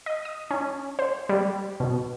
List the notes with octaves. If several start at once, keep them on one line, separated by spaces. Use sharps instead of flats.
D#5
D#6
C#4
C5
G3
B2